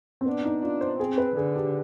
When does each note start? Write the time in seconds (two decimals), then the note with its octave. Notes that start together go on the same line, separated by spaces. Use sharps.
0.21 C4
0.26 B3 D4
0.45 D#4
0.62 D4 F4
0.81 C5
0.99 C4 G#4
1.18 B4
1.37 D3 G#4
1.56 G4